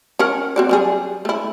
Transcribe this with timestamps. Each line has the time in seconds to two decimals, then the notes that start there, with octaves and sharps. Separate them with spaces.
0.19 C#4 A#4 F#5
0.56 C4 F#4 D5
0.69 F#3 G3 G#4
1.25 A3 E4